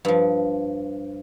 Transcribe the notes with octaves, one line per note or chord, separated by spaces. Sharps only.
G2 F3